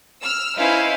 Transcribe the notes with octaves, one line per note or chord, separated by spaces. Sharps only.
E6 F6
C#4 D#4 E4 B4 C5 F5